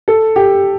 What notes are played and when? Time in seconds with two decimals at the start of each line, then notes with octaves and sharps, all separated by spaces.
0.08 A4
0.36 G4